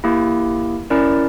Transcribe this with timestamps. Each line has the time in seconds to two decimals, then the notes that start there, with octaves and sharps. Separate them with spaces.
0.04 A#3 E4 G4
0.90 C#4 E4 A#4 D5